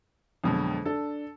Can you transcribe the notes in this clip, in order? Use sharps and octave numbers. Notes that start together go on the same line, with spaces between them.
F2 B2 D3 F#3 G#3
D4 A4